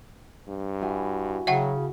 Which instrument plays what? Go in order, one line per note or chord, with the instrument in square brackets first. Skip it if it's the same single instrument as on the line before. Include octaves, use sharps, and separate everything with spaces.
[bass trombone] G2
[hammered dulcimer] E4 F#4 G#5
[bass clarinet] C#3 [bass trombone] F#3 [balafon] E5 F#5 G5